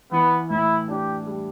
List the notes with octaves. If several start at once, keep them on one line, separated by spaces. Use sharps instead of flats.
E3 B3
A2 E4
D4 G4
G3